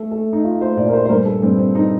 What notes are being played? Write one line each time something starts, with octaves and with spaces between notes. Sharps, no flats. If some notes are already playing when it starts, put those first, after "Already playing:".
Already playing: A3 A4
A3 A4
D#4
A3 F4
C5
A#2 D5
A#4
C5
C5
G2 A#4
A4
G2 C4
C4
G2 D#4